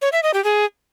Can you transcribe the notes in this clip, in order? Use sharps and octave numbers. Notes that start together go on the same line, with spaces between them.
C#5
E5
D#5
G4
G#4